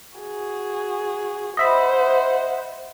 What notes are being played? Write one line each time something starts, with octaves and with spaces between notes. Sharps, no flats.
F#4 G#4
C5 D#5 E5 F#5 B5